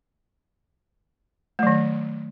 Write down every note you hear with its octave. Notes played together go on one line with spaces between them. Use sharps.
D#3 F#3 A3